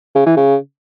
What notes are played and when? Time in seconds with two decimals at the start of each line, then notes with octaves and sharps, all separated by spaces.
0.15 C#3
0.26 E3
0.37 C#3